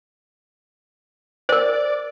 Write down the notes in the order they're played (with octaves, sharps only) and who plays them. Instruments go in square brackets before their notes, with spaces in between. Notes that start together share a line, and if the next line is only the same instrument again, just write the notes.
[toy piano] A#4 C5 [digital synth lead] D5